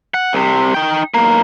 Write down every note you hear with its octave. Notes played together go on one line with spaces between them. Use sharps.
F#5
C2 C3
D#4 G5
B1 A#3